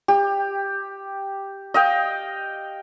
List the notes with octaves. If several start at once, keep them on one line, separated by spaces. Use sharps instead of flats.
G4
D#5 F5 G5